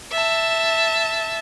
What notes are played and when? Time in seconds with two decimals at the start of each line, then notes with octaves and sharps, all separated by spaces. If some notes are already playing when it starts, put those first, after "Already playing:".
0.11 E5 A5